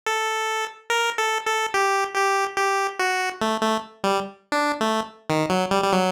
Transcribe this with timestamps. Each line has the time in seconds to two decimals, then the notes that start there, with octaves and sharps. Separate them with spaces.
0.06 A4
0.90 A#4
1.18 A4
1.46 A4
1.74 G4
2.16 G4
2.58 G4
2.99 F#4
3.42 A3
3.62 A3
4.04 G3
4.52 D4
4.81 A3
5.30 D#3
5.50 F#3
5.71 G3
5.84 G3
5.92 F#3